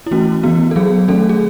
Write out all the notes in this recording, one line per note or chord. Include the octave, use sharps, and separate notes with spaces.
E4
E3 A3 C#4 F#4
E3 B3 F#4
A4
F#3 B3 G#4
D#3 A3 C#4 A4
G#4